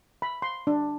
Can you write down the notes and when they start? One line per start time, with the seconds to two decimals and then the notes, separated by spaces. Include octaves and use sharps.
0.22 B5
0.42 C6
0.67 D4